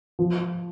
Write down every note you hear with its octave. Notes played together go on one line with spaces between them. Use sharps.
F3